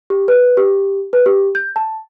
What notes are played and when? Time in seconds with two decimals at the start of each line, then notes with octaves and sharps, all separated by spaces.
0.10 G4
0.28 B4
0.57 G4
1.13 B4
1.26 G4
1.55 G6
1.76 A5